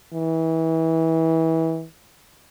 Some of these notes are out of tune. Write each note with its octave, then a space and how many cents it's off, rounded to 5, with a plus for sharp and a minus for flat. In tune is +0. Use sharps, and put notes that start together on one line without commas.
E3 -25